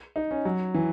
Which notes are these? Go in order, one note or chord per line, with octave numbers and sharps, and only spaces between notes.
D#4
C#4
F#3
E3